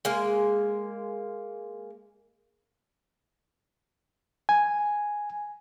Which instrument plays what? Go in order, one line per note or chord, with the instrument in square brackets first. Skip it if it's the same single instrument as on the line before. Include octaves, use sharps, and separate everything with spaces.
[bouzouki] G#3 A#3
[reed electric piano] G#5